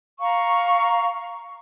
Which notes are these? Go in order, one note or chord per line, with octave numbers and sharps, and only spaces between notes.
F5 A#5 C#6